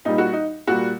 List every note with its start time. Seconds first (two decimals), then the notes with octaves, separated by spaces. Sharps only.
0.05 A#2 G3 D#4
0.18 F#4
0.33 D#4
0.67 A#2 G3 F#4